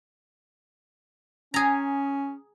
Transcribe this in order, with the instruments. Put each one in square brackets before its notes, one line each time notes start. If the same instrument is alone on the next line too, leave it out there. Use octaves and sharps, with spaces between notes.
[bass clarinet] C#4 [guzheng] G#4 A#5